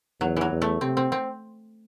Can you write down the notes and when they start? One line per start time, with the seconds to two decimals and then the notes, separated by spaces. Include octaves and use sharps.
0.21 E2 F#3
0.37 E3 F#3
0.51 E2
0.62 A3
0.81 C3 C4
0.97 C4
1.12 C4